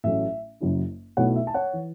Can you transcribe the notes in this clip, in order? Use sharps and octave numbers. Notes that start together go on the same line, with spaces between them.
A1 A2 F#3 A3 C#4 E5
F#1 F#2 F#3 C#4 E4
B1 B2 A3 E4 C#5 F#5
E5
A5
C#5 F#5
E3